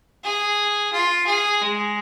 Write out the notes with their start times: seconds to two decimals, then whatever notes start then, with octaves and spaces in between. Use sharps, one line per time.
0.24 G#4
0.93 F4
1.27 G#4
1.61 G#3